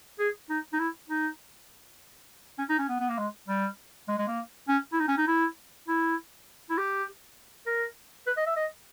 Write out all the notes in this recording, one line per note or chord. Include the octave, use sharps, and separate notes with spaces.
G#4
D#4
D#4
E4
D#4
C#4
D#4
C#4
B3
B3
A#3
G#3
G3
G#3
G#3
A#3
C#4
E4
D#4
C#4
D#4
E4
E4
E4
G4
A#4
B4
D#5
E5
D#5